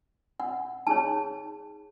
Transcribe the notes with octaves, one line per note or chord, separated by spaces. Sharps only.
F#5
D#4 G#4 C#5 A5